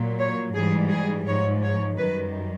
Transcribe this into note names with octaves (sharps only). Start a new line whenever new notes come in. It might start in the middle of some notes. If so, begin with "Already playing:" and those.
Already playing: A#2 F#3
C#5
G#2 E3 G3 G#4
G#4
G#2 F3 C#5
C#5
F#2 D#3 G3 B4